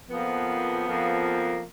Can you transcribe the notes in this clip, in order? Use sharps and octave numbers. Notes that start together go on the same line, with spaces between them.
F2 F3 A#3 B3
F2 F3 A#3